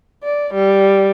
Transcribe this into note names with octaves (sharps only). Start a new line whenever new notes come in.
D5
G3